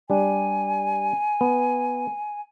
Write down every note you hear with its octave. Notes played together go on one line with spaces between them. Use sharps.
G3 D4 G#5
B3